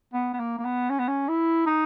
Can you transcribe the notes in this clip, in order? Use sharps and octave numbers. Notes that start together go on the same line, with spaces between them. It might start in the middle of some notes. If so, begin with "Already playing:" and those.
B3
B3
A#3
A#3
B3
C#4
B3
C#4
E4
D#4